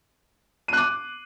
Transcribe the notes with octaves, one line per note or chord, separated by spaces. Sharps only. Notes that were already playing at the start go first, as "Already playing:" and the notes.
D6 F#6 D#7